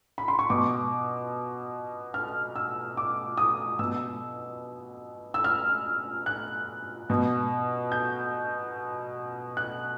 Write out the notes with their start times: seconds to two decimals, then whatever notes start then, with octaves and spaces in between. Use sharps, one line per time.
0.18 B5
0.28 C6
0.39 C#6
0.50 B2 D6
2.14 F6
2.56 E6
2.97 D6
3.38 D#6
3.79 B2 E6
5.34 E6
5.44 F6
6.26 F#6
7.10 B2
7.92 G6
9.57 F#6